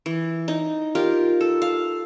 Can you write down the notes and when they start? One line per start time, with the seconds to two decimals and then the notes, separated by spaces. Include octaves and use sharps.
0.06 E3
0.48 D#4
0.95 F4 G4 A#4
1.41 A4
1.62 F5